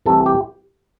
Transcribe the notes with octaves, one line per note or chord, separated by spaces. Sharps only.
C2 C3 E3 A3 A4
G4